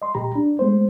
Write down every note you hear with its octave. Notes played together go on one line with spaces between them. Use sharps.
D#5 C6
A#2 G4 A#5 B5
D4
G#3 A3 B3 C5